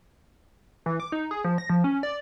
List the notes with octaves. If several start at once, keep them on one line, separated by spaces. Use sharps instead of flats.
E3
D6
D#4
G#4
F3
A#6
F3
C#4
D5